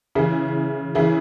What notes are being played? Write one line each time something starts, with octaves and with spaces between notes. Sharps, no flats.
C#3 E3 E4 G#4
C#3 E3 E4 G#4